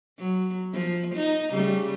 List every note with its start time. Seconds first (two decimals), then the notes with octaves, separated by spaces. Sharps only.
0.19 F#3
0.74 F3
1.15 D#4
1.51 C#3 G3 A3